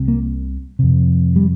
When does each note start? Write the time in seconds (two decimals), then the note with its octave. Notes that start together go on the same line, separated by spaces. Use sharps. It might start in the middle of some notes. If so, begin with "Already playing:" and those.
Already playing: C2 C3
0.08 A#3
0.79 F2 C3
1.36 G3